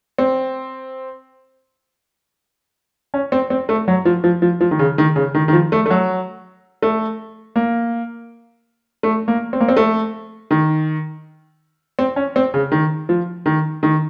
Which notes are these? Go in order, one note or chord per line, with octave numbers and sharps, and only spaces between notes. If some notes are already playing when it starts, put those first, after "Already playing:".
C4
C#4
C4
C4
A3
F#3
F3
F3
F3
F3
D#3
C#3
D#3
C#3
D#3
D#3
F3
A3
A3
F#3
A3
A#3
A3
A#3
C4
A#3
C4
A3
D#3
C4
C#4
C4
C#3
D#3
F3
D#3
D#3